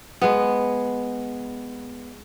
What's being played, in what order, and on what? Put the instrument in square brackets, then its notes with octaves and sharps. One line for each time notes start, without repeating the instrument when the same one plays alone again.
[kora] G#3 B3